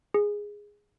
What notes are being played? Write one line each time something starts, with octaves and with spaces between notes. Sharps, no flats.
G#4